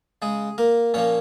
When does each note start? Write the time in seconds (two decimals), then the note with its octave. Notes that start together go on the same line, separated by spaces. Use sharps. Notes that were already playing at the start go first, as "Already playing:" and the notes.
0.22 C#3 G#3 G#4
0.58 A#3 A#4
0.94 A#2 F3 A#3 C#4 C#5